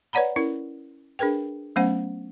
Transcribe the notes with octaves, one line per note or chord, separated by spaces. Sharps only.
B4 C#5 D5 F#5 A#5 B5
C#4 E4 A#4
D4 G#4 A#4 B4 G5
F#3 A3 B3 C#4 C5 F#5